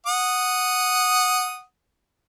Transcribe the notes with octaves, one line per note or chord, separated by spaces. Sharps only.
F#5 D#6